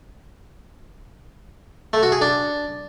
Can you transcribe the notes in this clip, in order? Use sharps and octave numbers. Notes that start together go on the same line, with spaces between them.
A3
F#4
G#4
D4